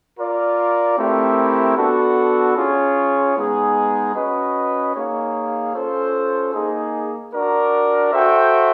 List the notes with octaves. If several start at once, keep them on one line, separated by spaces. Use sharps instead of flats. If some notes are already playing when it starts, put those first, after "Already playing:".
F4 A#4 D5
A3 C4 E4 G4 A#4
B3 D4 F#4 A4
C#4 F4 G#4 C#5
G#3 B3 D#4 G#4
C#4 F#4 B4 D#5
A#3 D#4 G#4 C#5 F5
C#4 F4 A4 C5
A#3 D#4 G#4
D4 F#4 A#4 D5
F#4 A4 C5 E5 G5